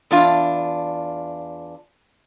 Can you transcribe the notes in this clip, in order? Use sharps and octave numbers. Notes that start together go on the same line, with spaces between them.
E2 D4 F4